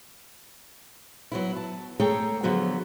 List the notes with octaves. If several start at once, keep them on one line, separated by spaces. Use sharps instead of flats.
F#3 B3 E4
A5
A3 G#4 A4 C#5 G5 A#5
D3 F3 F#3 B3 F#4